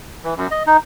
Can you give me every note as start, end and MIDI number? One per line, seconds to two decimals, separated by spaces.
0.24 0.34 52
0.37 0.47 42
0.51 0.63 75
0.67 0.77 63